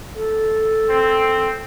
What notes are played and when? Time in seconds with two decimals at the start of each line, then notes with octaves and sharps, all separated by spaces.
0.16 A4
0.89 C4